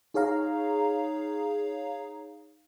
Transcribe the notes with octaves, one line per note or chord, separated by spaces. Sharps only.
D#4 G#4 C#5 F5 A#5